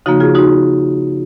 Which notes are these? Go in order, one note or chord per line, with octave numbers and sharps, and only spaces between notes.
C#3 F3 A#3 D#4 F#4
F4 G#4
D#4 F#4